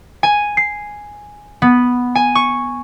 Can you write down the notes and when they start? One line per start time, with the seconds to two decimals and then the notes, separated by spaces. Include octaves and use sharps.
0.23 G#5
0.57 C7
1.62 B3
2.15 G#5
2.35 C#6